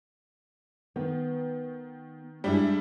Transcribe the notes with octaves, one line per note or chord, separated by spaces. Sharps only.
D#3 B3
G2 G3 G#3 D4 E4 G#4